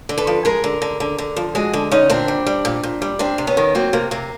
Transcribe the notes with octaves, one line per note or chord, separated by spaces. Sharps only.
D3
A4 B4
F3
G#3 G#4 A#4
D3
D3
D3
D3
F3
G#3 F#4 G#4
D3
D3 C#4 D#4
A#2 C4 D4
G3
G3
A#2
A#2
G3
C3 C4 D4
C3
B3 C#4
D#3
F#3 A#3 C4
C3 A#3
C3 A#3